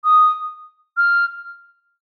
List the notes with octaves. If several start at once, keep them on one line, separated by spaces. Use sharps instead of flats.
D#6
F6